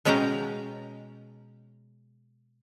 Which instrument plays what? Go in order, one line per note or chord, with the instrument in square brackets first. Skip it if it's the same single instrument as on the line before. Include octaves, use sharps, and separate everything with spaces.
[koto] B2 G#3 C#4 F5 G5 A#5